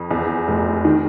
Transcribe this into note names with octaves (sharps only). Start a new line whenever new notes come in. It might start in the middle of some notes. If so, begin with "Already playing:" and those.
Already playing: F2
E2
F1
D#3